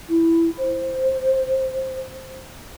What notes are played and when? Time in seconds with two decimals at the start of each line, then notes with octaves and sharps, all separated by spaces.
0.08 E4
0.57 C5